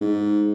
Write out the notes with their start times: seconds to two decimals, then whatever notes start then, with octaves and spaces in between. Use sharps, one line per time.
0.01 G#2